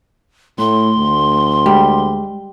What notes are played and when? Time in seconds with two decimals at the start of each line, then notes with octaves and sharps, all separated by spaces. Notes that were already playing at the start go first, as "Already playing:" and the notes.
0.59 A2 A3 C6
0.98 D2
1.66 G3 G#3